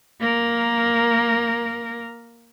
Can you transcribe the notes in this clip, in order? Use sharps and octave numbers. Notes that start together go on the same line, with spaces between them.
A#3 A#4